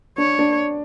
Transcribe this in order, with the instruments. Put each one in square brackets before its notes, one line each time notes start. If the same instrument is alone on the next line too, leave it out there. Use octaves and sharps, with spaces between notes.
[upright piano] D4 [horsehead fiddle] C#5
[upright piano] D4